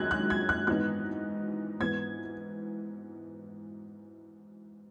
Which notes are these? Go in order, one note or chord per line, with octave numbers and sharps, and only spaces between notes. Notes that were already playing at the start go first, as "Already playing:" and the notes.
Already playing: F#2 D#3 G#3 F#6 G#6
F#6
G#6
F#6
G#2 E3 B3 D#4 F#6
G#2 E3 B3 G#6